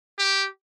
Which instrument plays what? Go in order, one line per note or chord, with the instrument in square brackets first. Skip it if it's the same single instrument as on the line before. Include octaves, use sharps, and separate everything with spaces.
[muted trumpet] G4